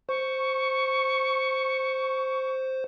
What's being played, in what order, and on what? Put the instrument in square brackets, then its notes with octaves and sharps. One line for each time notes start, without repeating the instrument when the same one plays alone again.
[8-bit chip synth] C5 [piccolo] C#6